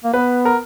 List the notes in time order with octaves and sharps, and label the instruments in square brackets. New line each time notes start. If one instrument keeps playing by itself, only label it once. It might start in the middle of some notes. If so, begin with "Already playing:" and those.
[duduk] A#3
[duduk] B3 [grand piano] B4
[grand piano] A#4